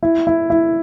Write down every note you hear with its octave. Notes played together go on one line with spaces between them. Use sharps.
E4
E4
E4